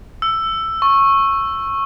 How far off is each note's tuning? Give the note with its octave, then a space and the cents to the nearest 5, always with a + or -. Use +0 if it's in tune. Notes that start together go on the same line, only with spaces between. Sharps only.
E6 +10
C#6 -15